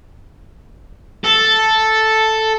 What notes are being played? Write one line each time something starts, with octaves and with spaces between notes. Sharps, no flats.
A4